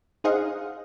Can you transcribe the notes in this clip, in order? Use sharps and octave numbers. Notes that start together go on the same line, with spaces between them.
D#4 G#4 C5 D#5 F5 F#5